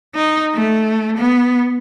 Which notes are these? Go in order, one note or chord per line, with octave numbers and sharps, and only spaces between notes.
D#4
A3
B3